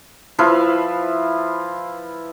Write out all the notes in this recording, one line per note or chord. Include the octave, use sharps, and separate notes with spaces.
F3 E4 B4 F5